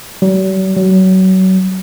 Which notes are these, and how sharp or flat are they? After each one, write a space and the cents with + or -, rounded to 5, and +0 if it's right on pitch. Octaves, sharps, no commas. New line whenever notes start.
F#3 +45
F#3 +25